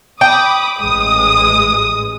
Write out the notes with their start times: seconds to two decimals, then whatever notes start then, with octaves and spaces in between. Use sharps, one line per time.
0.21 G5 B5 D6 D#6
0.79 A1 G#3 D#6